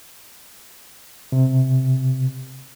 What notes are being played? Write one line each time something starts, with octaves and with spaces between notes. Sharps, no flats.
C3